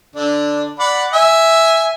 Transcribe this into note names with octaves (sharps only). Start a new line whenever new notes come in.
D3 D4
D5 F#5 B5
E5 G#5